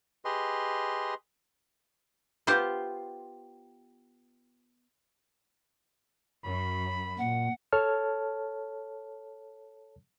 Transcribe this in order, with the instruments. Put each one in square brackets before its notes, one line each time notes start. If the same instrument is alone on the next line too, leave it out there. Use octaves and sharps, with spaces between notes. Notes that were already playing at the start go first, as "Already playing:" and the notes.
[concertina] G4 G#4 B4 D#5 C6
[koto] B3 F4 G4 C5
[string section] F#2 [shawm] B5
[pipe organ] A#2 [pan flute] F#5
[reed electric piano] A4 C#5 A5 F6